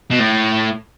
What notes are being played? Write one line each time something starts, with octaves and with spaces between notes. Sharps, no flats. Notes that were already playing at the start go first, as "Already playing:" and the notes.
B2
A2